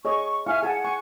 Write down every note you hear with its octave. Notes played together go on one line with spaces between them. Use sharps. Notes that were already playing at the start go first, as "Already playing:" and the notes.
G#4 C#5 D#5 C#6
E4 E5 F5 G#5 C#6 F6
G#4 F#5 G#5 A5
G#5 C#6